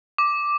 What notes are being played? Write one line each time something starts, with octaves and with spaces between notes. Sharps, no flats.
D6